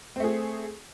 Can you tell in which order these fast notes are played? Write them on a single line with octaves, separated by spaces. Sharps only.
C4 A3 G#4